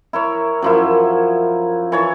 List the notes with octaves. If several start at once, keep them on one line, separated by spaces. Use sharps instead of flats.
E4 A#4 C#5
F#2 F3 E4
E3 C#5 A5